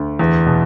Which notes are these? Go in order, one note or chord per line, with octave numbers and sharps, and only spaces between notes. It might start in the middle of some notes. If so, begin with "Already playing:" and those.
Already playing: D2
E2
B2